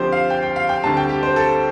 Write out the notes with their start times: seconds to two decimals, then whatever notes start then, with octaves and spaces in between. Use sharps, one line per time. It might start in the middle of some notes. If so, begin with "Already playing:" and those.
Already playing: D2 D3 F3 C4 G4 C5
0.12 F5
0.30 G5
0.43 G5
0.56 F5
0.69 G5
0.84 D2 D3 G3 C4 A5
0.97 G5
1.09 G4
1.23 C5
1.36 A4